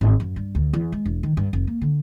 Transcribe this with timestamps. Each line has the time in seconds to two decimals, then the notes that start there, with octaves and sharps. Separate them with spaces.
0.01 G#1
0.20 F#2
0.36 G2
0.55 D2
0.73 E2
0.92 G#3
1.05 E1
1.23 D#3
1.37 G2
1.53 F1
1.67 A#3
1.82 D3